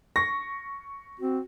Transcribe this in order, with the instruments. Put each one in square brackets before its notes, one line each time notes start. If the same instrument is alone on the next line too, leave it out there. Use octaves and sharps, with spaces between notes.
[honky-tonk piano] C#6 [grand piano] A#6
[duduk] C4 [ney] F#4